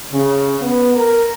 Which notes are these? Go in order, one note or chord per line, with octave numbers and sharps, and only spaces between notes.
C#3
B3
A#4